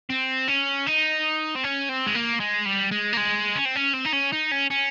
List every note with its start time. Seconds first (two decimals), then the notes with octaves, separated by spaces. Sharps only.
0.10 C4
0.48 C#4
0.87 D#4
1.56 C4
1.64 C#4
1.89 C4
2.06 G#3
2.15 A#3
2.40 G#3
2.66 G3
2.91 G#3
3.13 A#3
3.17 G#3
3.55 C#4
3.65 C4
3.76 C#4
3.93 C4
4.05 D#4
4.12 C#4
4.32 D#4
4.51 C#4
4.70 C#4